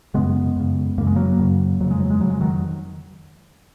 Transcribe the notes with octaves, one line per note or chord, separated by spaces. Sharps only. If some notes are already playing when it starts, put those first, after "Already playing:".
F#2 C#3 G#3 B3
F#2 C#3
F#2 C#3 A#3
G#3
F#3 A#3
F#2 C#3
F2 C#3 F#3
G#3
F#3
G#3
F2 C#3 F#3
G#3
D#3 F#3